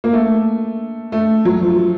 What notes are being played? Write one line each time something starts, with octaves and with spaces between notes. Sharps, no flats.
A#3
A3
A3
F#3
F3